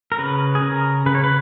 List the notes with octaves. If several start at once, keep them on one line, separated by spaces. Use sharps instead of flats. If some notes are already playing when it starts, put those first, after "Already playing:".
A#4
C#3 B4
G#4
C#3 A#4
C#3 B4
C#5
B4